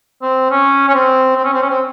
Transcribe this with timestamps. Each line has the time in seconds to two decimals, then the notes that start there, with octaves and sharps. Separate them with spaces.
0.22 C4
0.50 C#4
0.89 C#4
0.94 C4
1.36 C4
1.45 C#4
1.53 C4
1.62 C#4
1.70 C4